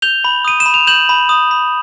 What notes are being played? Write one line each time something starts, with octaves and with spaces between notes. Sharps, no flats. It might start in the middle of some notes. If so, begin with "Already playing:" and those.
G6 F7 G7
B5
D#6 D#7
E7
B5
F7
G6 E7 F#7
B5
D#6
B5